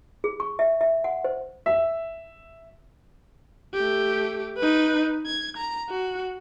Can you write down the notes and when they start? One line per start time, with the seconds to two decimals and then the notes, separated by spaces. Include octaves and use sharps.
0.24 G#4
0.40 C#6
0.59 E5
0.81 E5
1.04 F#5
1.24 C5
1.66 E5
3.74 A3 G4
4.58 D#4 B4
5.26 G#6
5.57 A#5
5.89 F#4